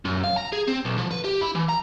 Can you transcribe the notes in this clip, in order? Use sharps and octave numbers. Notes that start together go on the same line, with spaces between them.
F#2
F5
A#5
G#4
C4
B1
F3
B4
G4
E4
E3
A#5